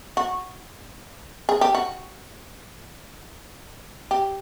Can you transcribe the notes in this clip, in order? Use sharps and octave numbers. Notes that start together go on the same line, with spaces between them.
F#4
G#4
G4
F#4
G4